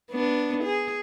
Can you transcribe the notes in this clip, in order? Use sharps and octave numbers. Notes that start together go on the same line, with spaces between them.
B3 D4
G#4